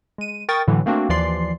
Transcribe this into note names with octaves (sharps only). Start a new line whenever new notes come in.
G#3 D#7
A#4 G5 C#6 D#6 A6
A2 D3 E3 F#3
A3 A#3 C4 D4 F#4
D#2 E3 F3 D5 C6 C7